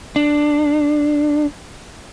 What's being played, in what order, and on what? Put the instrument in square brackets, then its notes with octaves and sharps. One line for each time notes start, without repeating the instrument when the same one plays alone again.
[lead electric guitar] D4